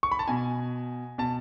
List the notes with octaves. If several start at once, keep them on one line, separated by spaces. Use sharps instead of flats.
C#6
B5
A5
B2 G#5
B2 A5